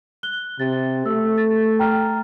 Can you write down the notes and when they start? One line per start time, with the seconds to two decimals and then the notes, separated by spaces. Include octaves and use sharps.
0.23 F#6 G7
0.60 C3 A6
1.06 A3 E6
1.38 A6
1.79 G5 A#5 F6